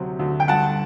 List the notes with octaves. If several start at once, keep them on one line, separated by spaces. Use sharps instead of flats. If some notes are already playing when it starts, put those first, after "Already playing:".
Already playing: D2 C3 F#3
D2
G5
G2 F#5 A5